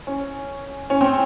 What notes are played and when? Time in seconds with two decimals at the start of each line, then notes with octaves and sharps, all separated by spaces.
0.07 C#4
0.90 C#4
1.01 C4